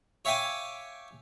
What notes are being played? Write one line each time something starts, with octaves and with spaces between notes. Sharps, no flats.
C#5 E5 F5 G5 G#5 D6